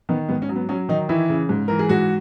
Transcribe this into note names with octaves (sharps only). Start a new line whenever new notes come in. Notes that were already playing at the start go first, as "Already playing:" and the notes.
D#3 B3
G#2 B3
C#4
F#3
B3
F#3 C#4
D#3 D#4
E3 E4
C#3
G#2
E3 A#4
G#4
G#2 F#4